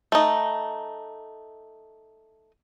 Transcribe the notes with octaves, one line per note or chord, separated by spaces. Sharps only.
A3 D#4